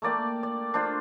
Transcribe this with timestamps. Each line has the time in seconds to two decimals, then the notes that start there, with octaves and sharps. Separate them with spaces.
0.02 A3 A#3 D5 G5
0.43 D5
0.74 D4 F4 C5